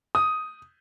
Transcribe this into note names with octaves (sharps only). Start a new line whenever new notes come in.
D#6